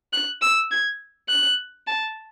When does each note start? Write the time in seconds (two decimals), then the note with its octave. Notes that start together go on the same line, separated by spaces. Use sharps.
0.13 F#6
0.42 E6
0.71 G#6
1.29 F#6
1.87 A5